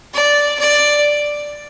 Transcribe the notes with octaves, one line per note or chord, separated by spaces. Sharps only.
D5
D5